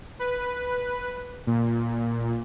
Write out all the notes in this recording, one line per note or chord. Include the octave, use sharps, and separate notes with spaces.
B4
A#2